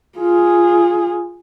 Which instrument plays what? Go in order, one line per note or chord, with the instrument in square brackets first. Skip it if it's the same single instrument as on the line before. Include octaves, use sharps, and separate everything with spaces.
[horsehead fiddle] F4 G#4